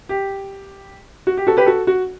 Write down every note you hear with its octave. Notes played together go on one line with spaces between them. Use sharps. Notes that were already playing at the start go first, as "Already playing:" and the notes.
G4
F#4
G4
F#4 A4
G4 B4
F#4 A4
F#4